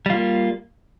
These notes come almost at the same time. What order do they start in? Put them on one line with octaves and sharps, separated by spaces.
G3 F4 A#3